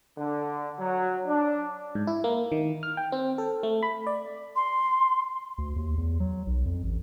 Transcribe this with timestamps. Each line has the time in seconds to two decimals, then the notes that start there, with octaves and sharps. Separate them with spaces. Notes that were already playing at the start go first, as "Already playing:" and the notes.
0.18 D3
0.78 F#3
1.26 D4
1.95 G#2
2.07 E4
2.24 A#3
2.52 D#3
2.83 F6
2.97 G5
3.12 C4
3.38 A4
3.63 A3
3.83 B5
4.07 D5
4.56 C6
5.58 D2
5.76 D#2
5.98 E2
6.20 F#3
6.47 B1
6.65 F2
6.84 A1